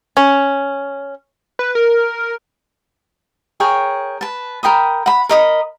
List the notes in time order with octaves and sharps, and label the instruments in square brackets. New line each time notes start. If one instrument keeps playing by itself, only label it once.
[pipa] C#4
[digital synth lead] B4
A#4
[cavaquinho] G#4 A#4 C#5 G5
B4 A5
A#4 G5 B5 D#6
F#5 B5
A#4 D#5 B5